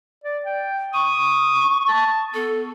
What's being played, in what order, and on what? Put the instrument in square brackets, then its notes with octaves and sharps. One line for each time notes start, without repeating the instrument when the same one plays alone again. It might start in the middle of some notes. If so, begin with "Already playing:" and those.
[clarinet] D5
G5
[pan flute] C#6 [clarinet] D#6
[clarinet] A5
[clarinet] B3 [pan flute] A4